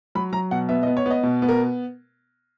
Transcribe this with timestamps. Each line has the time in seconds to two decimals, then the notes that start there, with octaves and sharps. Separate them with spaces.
0.15 F#3 B5
0.33 F#3 A#5
0.51 B2 F#5
0.69 B3 E5
0.83 B3 D#5
0.97 C#5
1.06 B3 D#5
1.23 B2
1.42 B3
1.48 A#4